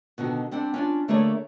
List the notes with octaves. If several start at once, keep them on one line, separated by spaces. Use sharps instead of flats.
B2 D3 D#3 F#4
G3 C4 D4 F#5
C#4 D4 F4
D3 A3 A#3 D4 G#4 C#5